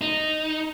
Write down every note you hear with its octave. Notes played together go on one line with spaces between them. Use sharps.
D#4